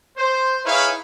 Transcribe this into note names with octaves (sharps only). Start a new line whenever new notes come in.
C5
D#4 E4 G#4 B4 C#5 F5